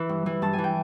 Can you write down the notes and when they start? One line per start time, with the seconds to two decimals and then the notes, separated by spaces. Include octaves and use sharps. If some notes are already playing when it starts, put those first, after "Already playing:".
Already playing: E3
0.09 G2
0.26 E3
0.42 G2 A5
0.53 G#5
0.58 E3
0.64 G5